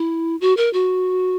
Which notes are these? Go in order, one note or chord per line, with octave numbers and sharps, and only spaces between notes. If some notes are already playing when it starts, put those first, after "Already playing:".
Already playing: E4
F#4
A#4
F#4